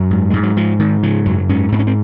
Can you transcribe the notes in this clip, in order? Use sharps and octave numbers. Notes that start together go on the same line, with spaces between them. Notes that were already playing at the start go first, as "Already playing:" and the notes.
Already playing: F#2 F#3
G#2
G#2 G#3
F#3
G#2 F3
G#2 D#3
C#3 F3
F#2 F#3
G#2 C#4
G#2 C4
C#4
C4